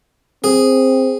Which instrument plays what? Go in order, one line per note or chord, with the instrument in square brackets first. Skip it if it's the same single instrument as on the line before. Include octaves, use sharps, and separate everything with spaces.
[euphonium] C4 [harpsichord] G#4